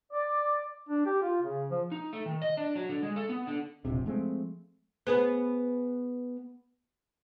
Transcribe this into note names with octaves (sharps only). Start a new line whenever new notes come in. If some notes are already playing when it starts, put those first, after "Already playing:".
D5
D4
G4
F4
C#3
F3
D#4
A3
D#3
D#5
D4
F#3
D3
G#3
A4
B3
D3
E1 A#1 C3
F3 G#3 A3 C4
B3 G#4 B4